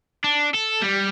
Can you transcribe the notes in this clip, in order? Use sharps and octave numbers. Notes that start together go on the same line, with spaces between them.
D4
A4
G3